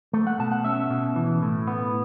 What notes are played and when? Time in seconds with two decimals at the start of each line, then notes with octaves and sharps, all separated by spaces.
0.13 A3
0.27 F#5
0.39 B2 A5
0.52 F#5
0.64 C#4 E5
0.90 B2
1.16 E3
1.42 A2
1.67 B3